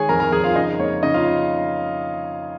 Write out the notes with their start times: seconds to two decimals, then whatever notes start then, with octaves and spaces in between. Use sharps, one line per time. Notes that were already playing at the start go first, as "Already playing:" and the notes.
Already playing: D#3 G#3 G#4 C#5 G#5
0.09 F2 A#4 A#5
0.20 A#4 A#5
0.32 F2 G#4 G#5
0.44 F4 F5
0.55 C#3 D#4 D#5
0.79 A#3 C#5
1.03 C#3 D#4 D#5
1.14 F4 F5